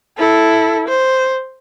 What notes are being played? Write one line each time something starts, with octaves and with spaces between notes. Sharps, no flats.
E4 A4
C5